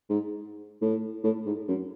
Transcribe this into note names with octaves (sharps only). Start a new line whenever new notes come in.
G#2
A2
A2
G#2
F#2